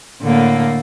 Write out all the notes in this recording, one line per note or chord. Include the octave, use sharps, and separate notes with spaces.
A2 D3 A#3